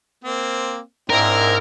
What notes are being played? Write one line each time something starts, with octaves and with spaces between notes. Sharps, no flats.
A#3 C4
G#2 C4 D4 E4 A#4